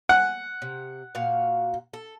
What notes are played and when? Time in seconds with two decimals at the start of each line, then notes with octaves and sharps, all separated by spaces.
0.09 F#5 G#5
0.62 C3
1.15 A#2 F#4 F5
1.93 A4